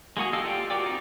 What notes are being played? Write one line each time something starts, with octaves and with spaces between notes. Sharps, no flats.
G#3 A#3 F#4 G#4
G4 A4 D#5 F5 E6
F4 G4 D5 F5 G5
F#4 G4 A#4 D5 G5
C4 D#4